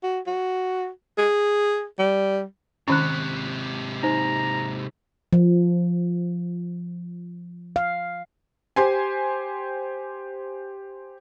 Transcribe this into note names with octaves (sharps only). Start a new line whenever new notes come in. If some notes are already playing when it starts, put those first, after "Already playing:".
F#4
F#4
G#4
G3
G#2 C3 D#3 C#4 C#6 F#6
D#4 C5 A#5
F3
F5
G4 C5 G#5